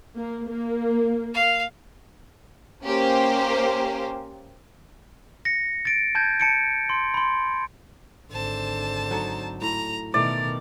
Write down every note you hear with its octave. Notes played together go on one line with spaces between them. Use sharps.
A#3
A#3
F5
A#3 C#4 G4 C5
A#6 C#7
A6 D7
A5 G6 G#6
A5 C#7 D7
C6
B5 C6
G#1 D3 C5 A5
F#3 D#4 A4
A2 A#5
B2 D#3 E3 A3 A#4 D5